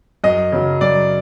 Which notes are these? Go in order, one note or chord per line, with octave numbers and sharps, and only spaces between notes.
F#2 D#5
C#3 F#3
F#2 D5